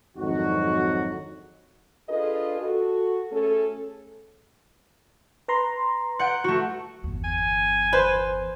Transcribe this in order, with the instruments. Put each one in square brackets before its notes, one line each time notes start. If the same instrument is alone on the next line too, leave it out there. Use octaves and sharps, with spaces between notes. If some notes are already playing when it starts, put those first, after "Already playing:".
[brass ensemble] G#1 F2 D3 F#3 D#4 F#4
[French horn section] D4 F4 G#4 A4 B4 D#5
F#4 A4
A3 C#4 G#4 A4
[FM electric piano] B4 A#5 C6
[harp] F#5 G6 D7
A3 F#4
[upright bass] G1 E2
[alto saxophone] G#5
[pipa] B4 [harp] C5